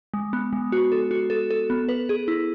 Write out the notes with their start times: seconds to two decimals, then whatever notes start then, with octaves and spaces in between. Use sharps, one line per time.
0.14 G#3
0.33 B3
0.53 G#3
0.72 F#4
0.92 A4
1.11 F#4
1.30 A4
1.51 A4
1.70 B3
1.89 B4
2.09 G#4
2.28 E4